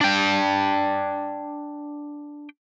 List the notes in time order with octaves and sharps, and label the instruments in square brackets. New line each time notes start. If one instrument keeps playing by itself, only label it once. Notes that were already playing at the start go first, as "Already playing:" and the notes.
[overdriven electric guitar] D4 G5